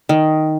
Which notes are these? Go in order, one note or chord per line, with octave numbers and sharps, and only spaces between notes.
D#3